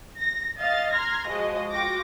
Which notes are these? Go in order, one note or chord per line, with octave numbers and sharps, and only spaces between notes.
A#6
D#5 F5 A6
A#5 C6 F6 G#6 A#6
F3 G#3 F#4 D#5
F4 F#4 G5 D6 A#6